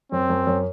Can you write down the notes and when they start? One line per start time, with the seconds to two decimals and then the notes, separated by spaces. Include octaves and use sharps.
0.12 F#2 C4
0.30 F#2
0.47 F#2